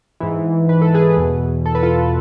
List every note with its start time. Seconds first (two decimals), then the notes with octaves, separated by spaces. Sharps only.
0.20 G#2 E3
0.69 B4
0.82 A4
0.94 G#4 B4
1.17 E2 B2
1.66 A4
1.75 B4
1.83 F4 A4